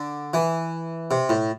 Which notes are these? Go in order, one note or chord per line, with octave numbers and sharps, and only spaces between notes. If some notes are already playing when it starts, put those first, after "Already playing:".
Already playing: D3
E3
C3
A2